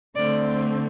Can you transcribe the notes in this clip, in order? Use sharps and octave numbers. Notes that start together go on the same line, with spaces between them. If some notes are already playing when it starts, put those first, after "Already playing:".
D3 A3 C4 D5